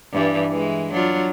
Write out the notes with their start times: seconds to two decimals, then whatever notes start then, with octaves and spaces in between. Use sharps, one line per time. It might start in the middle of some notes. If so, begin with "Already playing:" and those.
0.13 G2 E3 G3
0.51 E3 G#3
0.93 F#3 D4 F4